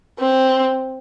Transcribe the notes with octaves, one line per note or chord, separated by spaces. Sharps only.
C4